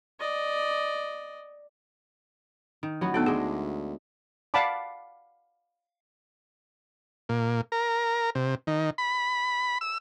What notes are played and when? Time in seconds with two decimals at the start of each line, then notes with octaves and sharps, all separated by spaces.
0.20 D5 D#5
2.83 D#3
3.01 A1 F#3 B3 F#4
3.14 D2 B3 D#4 A4 G5
3.26 G#3 D4 G#4 D#5
4.54 D5 F5 F#5 A5 B5 D6
7.29 A#2
7.72 A#4
8.35 C3
8.67 D#3
8.98 B5
9.81 E6